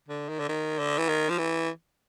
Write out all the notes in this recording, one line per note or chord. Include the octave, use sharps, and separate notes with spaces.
D3
D#3
D3
D#3
D3
E3
D#3
F3
E3